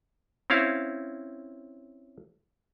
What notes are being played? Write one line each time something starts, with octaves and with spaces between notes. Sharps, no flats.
C4 C#4 E4 F5